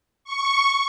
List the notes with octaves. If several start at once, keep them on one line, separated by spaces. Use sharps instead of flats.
C#6